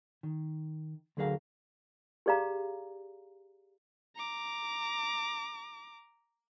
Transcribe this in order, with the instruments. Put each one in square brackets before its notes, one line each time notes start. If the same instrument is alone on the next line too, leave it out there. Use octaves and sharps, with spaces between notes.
[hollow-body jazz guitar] D#3
D2 D3 F#3 G#4 A#4 F5
[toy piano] G4 G#4 D5 F5 A#5
[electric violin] A#5 D6